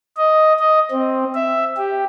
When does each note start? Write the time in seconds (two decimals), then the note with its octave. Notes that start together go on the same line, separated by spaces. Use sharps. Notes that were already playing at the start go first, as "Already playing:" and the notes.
0.17 D#5
0.59 D#5
0.91 C4
1.35 E5
1.77 G4